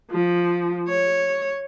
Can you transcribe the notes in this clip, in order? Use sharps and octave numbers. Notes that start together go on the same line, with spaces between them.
F3
C#5